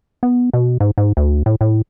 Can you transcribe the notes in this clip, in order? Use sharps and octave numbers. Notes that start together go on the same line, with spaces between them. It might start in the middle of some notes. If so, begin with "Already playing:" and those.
B3
B2
G#2
G#2
D2
A2
A2